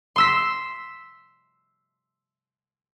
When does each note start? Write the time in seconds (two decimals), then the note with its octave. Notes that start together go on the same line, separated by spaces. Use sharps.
0.16 C6 E6 B6